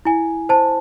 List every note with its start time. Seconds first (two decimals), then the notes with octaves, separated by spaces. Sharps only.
0.05 E4 G#5
0.49 C5 A5